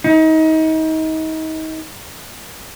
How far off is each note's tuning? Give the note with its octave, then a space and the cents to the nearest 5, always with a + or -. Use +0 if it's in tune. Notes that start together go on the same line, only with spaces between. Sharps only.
D#4 +30